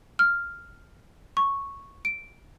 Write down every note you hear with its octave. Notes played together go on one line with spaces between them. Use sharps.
F6
C#6
D7